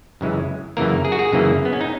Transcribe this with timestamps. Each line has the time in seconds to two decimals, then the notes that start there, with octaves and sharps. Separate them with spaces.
0.21 F#2 C#3 E3 G#3
0.77 F#2 C#3 E3 A#3 A#4
1.05 G#4
1.12 F#4
1.19 G#4
1.33 F#2 C#3 E3 A#3
1.65 B3
1.73 C#4
1.81 D#4